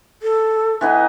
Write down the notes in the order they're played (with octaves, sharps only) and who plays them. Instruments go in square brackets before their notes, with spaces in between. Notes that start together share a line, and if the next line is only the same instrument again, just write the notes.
[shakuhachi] A4
[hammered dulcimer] E3 B3 D#4